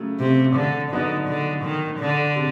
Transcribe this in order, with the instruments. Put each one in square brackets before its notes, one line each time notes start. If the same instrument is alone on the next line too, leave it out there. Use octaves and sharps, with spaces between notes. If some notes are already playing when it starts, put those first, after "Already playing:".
Already playing: [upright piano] C#3 F#3 A3
[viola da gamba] C3
D3
[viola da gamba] D3 [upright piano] F#3 B3 D#4
[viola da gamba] D3
D#3
D3
[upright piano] C3